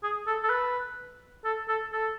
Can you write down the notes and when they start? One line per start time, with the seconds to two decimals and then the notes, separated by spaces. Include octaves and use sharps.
0.03 G#4
0.27 A4
0.43 A4
0.50 B4
1.45 A4
1.68 A4
1.92 A4